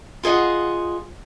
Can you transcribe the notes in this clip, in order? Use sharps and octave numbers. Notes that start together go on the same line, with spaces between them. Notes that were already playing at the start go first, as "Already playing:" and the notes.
F4 G#4 D#5 F#5